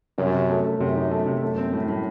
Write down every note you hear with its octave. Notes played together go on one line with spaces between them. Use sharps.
F#2 C3
C3
A3
A3
F#2 C3
D#4
A3
C3
F#2 A3
C4
A2
A2